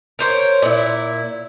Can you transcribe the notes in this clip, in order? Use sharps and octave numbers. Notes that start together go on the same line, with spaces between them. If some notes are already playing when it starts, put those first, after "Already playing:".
A#4 C5 C#5
A#2 E4